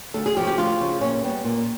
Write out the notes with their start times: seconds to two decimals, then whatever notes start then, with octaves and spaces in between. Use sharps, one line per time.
0.14 D2 A4
0.26 G#4
0.36 F3 G4
0.41 C#3
0.47 G4
0.58 D2 F4
0.80 C#3 F3
1.01 A#2 C#4
1.23 G3 B3
1.44 A#2